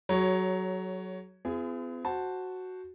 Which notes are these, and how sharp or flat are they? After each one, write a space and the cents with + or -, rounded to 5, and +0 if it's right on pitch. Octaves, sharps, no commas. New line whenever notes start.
F#3 +15 G#4 +45 C#5 +0
B3 +45 F4 -45 G#4 +0
F#4 +0 C5 +0 A5 +0